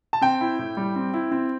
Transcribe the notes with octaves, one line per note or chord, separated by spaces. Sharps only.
A5
C4 G5
E4
A2
G3
C4
E4
C4